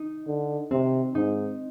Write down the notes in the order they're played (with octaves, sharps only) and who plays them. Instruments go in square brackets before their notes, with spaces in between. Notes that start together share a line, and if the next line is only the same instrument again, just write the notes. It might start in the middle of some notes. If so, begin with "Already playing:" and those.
Already playing: [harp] D#4
[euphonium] D3
[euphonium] C3 [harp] C4
[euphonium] G#2 [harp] D#4